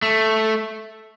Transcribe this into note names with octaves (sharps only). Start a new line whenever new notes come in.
A3